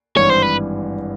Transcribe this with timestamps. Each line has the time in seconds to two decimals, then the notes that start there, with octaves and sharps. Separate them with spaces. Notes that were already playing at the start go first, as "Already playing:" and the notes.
0.16 G#1 G2 E3 C#5
0.30 C5
0.43 B4